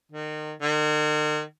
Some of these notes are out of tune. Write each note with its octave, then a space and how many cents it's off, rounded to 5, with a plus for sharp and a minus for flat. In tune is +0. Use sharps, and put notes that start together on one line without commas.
D#3 -30
D#3 -45